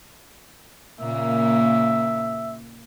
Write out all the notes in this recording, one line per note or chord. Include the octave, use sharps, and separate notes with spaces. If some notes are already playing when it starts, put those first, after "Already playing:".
A#2 C#3 A#3 E5